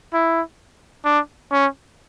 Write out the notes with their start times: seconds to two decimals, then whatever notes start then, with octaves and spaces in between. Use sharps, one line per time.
0.14 E4
1.05 D4
1.52 C#4